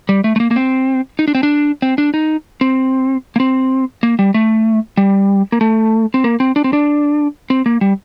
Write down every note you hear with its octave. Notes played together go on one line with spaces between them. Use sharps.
G3
A3
A3
A#3
A#3
C4
D#4
D4
C4
D4
C4
D4
D#4
C4
A#3
C4
A#3
G3
A3
G3
A#3
A3
C4
A#3
C4
D4
C4
D4
C4
A#3
G3